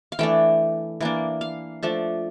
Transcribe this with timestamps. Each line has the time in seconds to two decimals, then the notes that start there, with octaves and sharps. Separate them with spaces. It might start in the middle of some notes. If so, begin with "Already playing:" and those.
0.12 F5
0.19 E3 A3 D4 G5
1.01 E3 A#3 D4
1.41 F5
1.83 F3 A3 D4